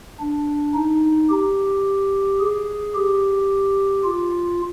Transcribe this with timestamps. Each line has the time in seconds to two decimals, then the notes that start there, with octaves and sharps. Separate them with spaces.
0.20 D4
0.74 D#4
1.30 G4
2.40 G#4
2.95 G4
4.04 F4